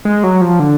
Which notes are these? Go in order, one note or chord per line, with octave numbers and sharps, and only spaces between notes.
G#3
F#3
F3
D3